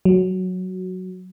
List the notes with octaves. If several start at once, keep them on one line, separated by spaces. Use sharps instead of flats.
F#3